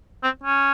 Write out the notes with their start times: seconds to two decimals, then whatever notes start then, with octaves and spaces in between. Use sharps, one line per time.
0.23 C4
0.43 C#4